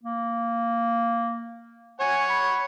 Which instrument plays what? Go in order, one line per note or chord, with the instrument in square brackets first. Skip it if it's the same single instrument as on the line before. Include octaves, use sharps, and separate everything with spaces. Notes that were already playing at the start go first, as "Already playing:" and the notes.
[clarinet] A#3
[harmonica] C#5 F#5 [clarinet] G#5
[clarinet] B5